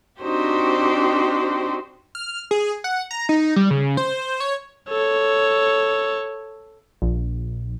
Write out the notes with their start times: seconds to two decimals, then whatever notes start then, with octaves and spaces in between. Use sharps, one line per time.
0.21 C4 D4 D#4 F#4 G4 C5
2.15 F6
2.51 G#4
2.84 F#5
3.11 A#5
3.29 D#4
3.56 G3
3.71 C#3
3.97 C5
4.40 C#5
4.89 A4 C#5
7.02 A#1